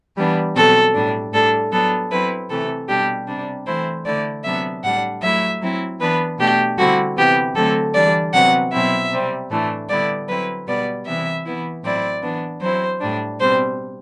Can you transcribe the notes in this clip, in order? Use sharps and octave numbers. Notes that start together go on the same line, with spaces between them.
E3 G3 B3 D4
B2 F#3 C4 A4
A2 G3 D4
A2 G3 D4 A4
F#3 B3 D4 A4
F#3 C4 E4 B4
C3 E3 A3 A4
B2 G3 D4 G4
C3 G3 D4
E3 A3 C4 E4 C5
D3 A3 E4 D5
C3 F#3 B3 D4 E5
A2 G3 D4 F#5
F#3 A3 E4 E5
F#3 C4 E4
E3 B3 D4 B4
B2 A3 D4 G4
D3 G3 C4 E4 F#4
C3 E3 B3 G4
D3 F#3 A3 C4 A4
E3 G3 D4 D5
C3 F#3 B3 F#5
B2 F#3 C4 E4 E5
C3 G3 C4
A2 E3 A3 D4
D3 G3 B3 E4 D5
F#3 C4 E4 B4
B2 G3 B3 D5
C3 E3 B3 E4 E5
E3 B3 E4
A2 F#3 C4 E4 D5
E3 B3 D4
F#3 C4 E4 C5
A2 G3 D4
B2 G3 C4 C5